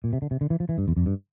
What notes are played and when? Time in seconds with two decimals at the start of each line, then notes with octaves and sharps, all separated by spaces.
0.04 A#2
0.13 C3
0.22 D3
0.31 C3
0.41 D3
0.50 E3
0.60 F3
0.69 E3
0.78 G2
0.88 E2
0.97 F2
1.06 G2